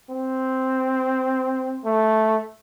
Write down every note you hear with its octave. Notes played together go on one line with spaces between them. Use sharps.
C4
A3